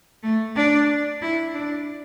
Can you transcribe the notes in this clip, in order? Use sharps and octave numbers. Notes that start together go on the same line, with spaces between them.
A3
D4
E4
D4